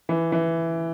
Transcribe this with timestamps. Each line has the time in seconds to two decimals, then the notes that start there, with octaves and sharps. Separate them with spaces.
0.09 E3
0.32 E3